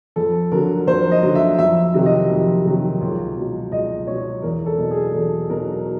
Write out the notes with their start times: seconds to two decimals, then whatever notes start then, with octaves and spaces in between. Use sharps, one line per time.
0.16 F2 A4
0.52 D3 F#3 A#4
0.87 F2 C5
1.11 D#5
1.23 D3 F#3
1.35 E5
1.58 F2 E5
1.94 C3 D#3 F#3
2.06 D#5
2.30 F2
2.65 C3 D#3 F#3
3.01 C#2
3.36 B2 F#3
3.72 C#2 D#5
4.07 B2 F#3 C#5
4.42 E2 A#4
4.66 A4
4.78 B2 F#3
4.91 G#4
5.14 E2 A4
5.49 B2 F#3 A#4